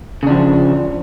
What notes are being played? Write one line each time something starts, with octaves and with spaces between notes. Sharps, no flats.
C#3 F3 D4